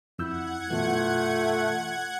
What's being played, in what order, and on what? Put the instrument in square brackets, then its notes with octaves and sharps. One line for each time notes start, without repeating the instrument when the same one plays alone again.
[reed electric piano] F2 E6 G6 [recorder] E4 [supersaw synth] F#5 G#6
[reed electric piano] F#2 B2 E3 [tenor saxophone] A3 [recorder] F4